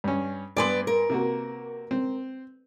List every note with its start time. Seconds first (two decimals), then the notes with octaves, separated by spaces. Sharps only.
0.04 G2 C#4
0.57 G2 B3 B4 D5 G#5 C6
0.87 A#4
1.10 C3 A#3 F#4
1.91 C4